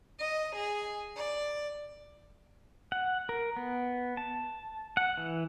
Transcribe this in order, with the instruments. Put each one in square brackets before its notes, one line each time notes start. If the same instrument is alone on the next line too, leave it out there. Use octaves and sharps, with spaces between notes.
[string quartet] D#5
G#4
D5
[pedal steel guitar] F#5
A#4
B3
A5
F#5
E3